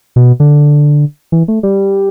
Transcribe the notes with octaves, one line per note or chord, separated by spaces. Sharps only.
B2
D3
E3
A3
G3